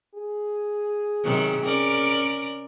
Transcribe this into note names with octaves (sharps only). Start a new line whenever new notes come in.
G#4
C3 D#3 F#3
C#4 A#4 D5